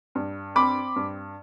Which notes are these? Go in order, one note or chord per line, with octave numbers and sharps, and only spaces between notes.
G2
C4 B5 D6
G2